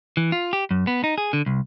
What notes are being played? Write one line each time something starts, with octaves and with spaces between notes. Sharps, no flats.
E3
F4
G4
F#2
B3
D#4
G#4
D3
C2